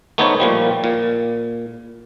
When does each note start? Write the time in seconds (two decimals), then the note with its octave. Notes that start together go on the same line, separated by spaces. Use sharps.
0.18 A3 B3 D#4 C5 C#5
0.40 A#2 F3 G3
0.84 A#2